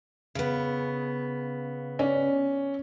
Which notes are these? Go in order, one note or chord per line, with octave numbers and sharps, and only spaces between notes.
C#3 B3
C#4 D5